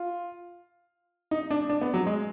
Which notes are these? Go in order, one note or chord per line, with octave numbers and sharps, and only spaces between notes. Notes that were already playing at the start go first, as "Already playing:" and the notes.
Already playing: F4
D#4
D4
D4
B3
F#3
G#3